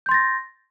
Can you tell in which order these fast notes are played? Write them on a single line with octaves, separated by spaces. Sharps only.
G6 C6 A6 A#6